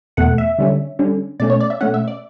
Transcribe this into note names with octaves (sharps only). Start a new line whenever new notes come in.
E2 B2 A3 F#5
E5
D3 G3 C#4
D3 G3 C#4
B2 A3 C#4 D5
C#5
D5
E5
B2 A3 C#4 F#5
E5
D5